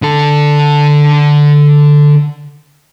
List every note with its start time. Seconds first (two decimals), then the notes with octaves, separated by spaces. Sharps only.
0.02 D3 A4